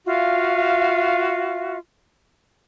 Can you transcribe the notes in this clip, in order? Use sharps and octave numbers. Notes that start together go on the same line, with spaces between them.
F4 F#4 E5 F5